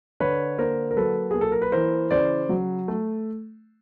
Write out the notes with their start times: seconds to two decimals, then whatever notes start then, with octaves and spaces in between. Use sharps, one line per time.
0.20 D3 B4 C#5
0.58 A#3 A#4 C5
0.91 A#4
0.97 F#3 A4 B4
1.31 A#3 G#4
1.41 A4
1.52 A#4
1.62 B4
1.72 E3 A#4 C5
2.11 C#3 C5 D5
2.49 F#3
2.88 A3